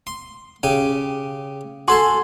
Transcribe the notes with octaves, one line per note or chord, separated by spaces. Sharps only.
C6
C#3 G4 G#5
F#4 A4 G#5 A5 C6